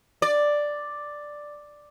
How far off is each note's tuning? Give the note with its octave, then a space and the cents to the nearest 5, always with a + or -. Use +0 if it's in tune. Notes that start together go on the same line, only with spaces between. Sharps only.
D5 +5